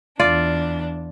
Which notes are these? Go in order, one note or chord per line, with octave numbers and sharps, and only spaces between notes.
E2 D4 F4 D5